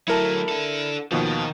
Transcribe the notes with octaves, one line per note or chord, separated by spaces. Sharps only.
F#3 A3 E4 A#4 A5
D4 A4
D#2 B2 D#3 F3